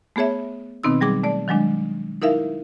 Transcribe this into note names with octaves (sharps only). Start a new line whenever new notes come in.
A3 B3 G#4 C#5 E5
B2 D#3 B3 C4 D#4 E6
F#3 G3 G#4 D6
A3 D5
D#3 F#3 G#3 D4
D#4 E4 A#4 E5 F5